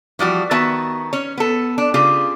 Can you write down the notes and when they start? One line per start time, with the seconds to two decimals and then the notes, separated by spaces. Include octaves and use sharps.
0.19 E3 F3 G3 F#4
0.51 D#3 B3 F#4 E5 A5
1.13 C#4 C#5
1.37 B3 A4
1.78 D4
1.94 C#3 F4 G4 G#4